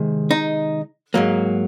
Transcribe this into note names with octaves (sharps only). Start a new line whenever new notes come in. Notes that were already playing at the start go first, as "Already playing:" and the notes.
Already playing: C3 D#3 G#3
D#4
G#2 F#3 A#3